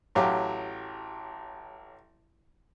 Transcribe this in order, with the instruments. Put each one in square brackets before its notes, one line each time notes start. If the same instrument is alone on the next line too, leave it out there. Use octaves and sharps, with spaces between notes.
[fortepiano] A1 F#3 G4 F5